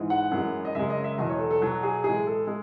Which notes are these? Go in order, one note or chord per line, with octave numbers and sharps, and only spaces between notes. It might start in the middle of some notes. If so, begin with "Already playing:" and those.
Already playing: G#2 E3 G#3
F#5
F#2 E3 G#3
D#5
F#2 C#3 G#3 E5
D#5
E5
E2 B2 F#3 D#5
C#5
A4
A4
B2 F#3 F#4
G#4
A2 E3 G#3 G#4
A4
G#3